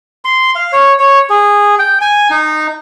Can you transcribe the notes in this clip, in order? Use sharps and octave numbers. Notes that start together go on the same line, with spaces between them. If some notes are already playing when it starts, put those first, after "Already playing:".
C6
F5
C#5
C#5
G#4
G5
G#5
D#4